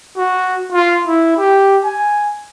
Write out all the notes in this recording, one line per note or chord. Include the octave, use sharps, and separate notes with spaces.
F#4
F4
E4
G4
G#5